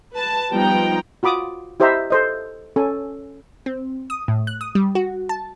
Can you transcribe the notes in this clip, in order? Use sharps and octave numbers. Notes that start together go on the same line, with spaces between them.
B4 A5
F3 G3 B3 D#4 G5 A#5
F4 F#4 B5 D6 D#6
E4 G4 C5 D#5 E5 A#5
A4 C5 D#5
C#4 A4 G#5
C4
D#6
A2
F#6
D#6
G3
F#4
A5